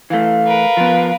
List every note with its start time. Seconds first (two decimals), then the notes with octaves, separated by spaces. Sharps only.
0.10 E3 A3 F5
0.47 A#4 B4
0.77 F3 B3